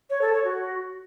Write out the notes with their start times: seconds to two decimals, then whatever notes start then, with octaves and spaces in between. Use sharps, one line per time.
0.10 C#5
0.21 A4
0.33 C#5
0.44 F#4